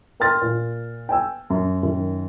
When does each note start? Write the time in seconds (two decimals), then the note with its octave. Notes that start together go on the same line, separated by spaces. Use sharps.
0.20 A#4 G5 C6 F6 A6
0.42 A#2
1.09 G5 G#5 E6
1.50 F#2
1.83 F#2 D#3